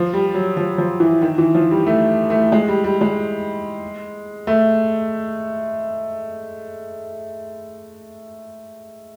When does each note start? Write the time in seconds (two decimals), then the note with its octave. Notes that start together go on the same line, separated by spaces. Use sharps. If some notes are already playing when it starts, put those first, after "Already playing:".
Already playing: F3
0.13 G3
0.35 F#3
0.57 F3
0.78 F3
1.00 E3
1.22 D#3
1.38 E3
1.55 F3
1.71 G3
1.86 A3
2.30 A3
2.52 G#3
2.68 G3
2.84 G3
3.01 G#3
4.47 A3